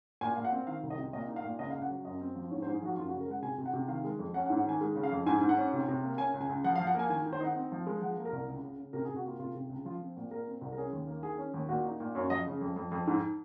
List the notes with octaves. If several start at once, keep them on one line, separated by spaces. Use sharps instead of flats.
A#2 G#5
A#2 F5
F#5
C4
D#3 F5
C2
D#5
C3
A#2 D#5
D#4
F5
A#2
C#2 D#5
F5
C#2
F#5
F#3
F#2 D#5
C4
F3
G#2 C#5
C5
G#2
G#4
F3 F#4
F#2 F4
F#4
C#3
A#4
G#3 F#5
C3 G#5
C3
F#5
C3
D#3 F5
G#3
F2
C#4 F#5
F#5
G#2
F#5
D#3 G#5
G#3
C#3
F5
F2
G#2 G#5
G#2
F#5
C#4
C3
C3
A#3
C#4 G#5
C#2
G#5
C#2
F3 F#5
F5
F3
F#5
A#3 G#5
D#3 G#5
D#3
C5
D#4 F#5
C4
F3
G#3
F3 F#5
A#3
A#4
C2
C#2
C#3
C#3
C3 A#4
G#4
C3
F#4
A#3 F4
C3 F4
C3
C#2
F3 F4
C4
A#2
A#2 A#4
C4
C2
A#4
C#4 G#4
D#2
A#3
D#3 G#4
C#4
D#2
A#2 F#4
D#4
A#2
F#2 C#5
F3 D#5
C#3
F2
F2
F2
G#2